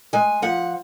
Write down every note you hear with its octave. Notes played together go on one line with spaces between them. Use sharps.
G#3 G#5
F3 F#5